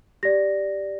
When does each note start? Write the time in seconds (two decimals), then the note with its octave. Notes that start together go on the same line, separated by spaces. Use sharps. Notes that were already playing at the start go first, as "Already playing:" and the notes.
0.23 G4 D5 A#6